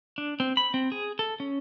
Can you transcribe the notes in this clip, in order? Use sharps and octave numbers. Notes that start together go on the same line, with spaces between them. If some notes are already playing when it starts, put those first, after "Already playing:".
D4
C4
B5
C4
G#4
A4
C#4